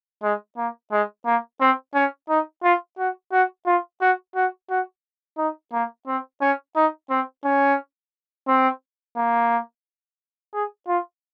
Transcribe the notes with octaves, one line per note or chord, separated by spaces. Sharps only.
G#3
A#3
G#3
A#3
C4
C#4
D#4
F4
F#4
F#4
F4
F#4
F#4
F#4
D#4
A#3
C4
C#4
D#4
C4
C#4
C4
A#3
G#4
F4